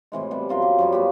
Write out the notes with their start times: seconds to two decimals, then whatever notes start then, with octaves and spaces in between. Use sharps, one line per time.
0.12 A2 C3 E3 G#3
0.31 C3 G3 B3
0.49 F#2 F4 A#4 C6
0.62 G4
0.78 F#2 F3 G3 C#4
0.92 A#3 B3 F#4 G4